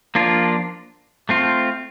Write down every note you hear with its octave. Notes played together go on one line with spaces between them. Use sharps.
F3 A#3 D4 F4
A3 C4 F4